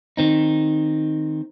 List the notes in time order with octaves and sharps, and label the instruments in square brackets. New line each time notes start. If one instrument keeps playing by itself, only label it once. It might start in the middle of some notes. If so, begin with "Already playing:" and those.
[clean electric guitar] D#3 C4 D#4